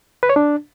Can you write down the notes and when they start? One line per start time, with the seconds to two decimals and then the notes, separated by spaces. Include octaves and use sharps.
0.23 B4
0.29 C#5
0.36 D4